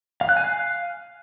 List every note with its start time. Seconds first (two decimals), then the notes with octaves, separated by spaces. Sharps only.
0.21 F5
0.29 F#6
0.36 G#5
0.44 F5